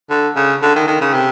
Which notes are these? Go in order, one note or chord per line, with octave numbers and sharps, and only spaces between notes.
D3
C#3
D3
D#3
D#3
C#3
C3